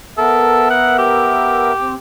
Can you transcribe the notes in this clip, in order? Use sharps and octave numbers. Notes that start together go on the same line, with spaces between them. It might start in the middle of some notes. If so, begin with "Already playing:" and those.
B3 A4 A#4 E5
F#5
G4
C4